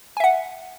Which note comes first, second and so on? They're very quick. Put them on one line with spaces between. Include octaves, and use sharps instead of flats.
G#5 E5 F#5